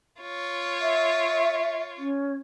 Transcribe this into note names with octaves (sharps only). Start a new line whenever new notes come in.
F4 C#5
E5
C#4